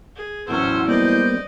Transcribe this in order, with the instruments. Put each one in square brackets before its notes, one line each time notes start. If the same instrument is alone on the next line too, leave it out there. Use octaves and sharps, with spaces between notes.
[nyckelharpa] G#4
[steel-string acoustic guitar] E2 A2 F#3 [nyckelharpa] C#4 C5 [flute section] F#5 C6 E6
[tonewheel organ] G3 A#3 B3 [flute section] C5 G6 [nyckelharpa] D5 D#5